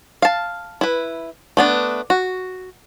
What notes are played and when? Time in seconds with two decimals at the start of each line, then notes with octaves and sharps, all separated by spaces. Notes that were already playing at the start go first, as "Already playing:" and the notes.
0.22 F5 A5
0.81 E4 B4
1.57 A3 B3 D4
2.10 F#4